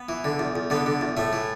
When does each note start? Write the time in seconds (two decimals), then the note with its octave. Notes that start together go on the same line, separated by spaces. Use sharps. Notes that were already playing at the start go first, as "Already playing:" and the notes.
Already playing: B3
0.09 E3
0.24 D3
0.39 E2
0.56 E2
0.70 D3 B3
0.86 D3
1.01 E2
1.17 A2 A3
1.33 E3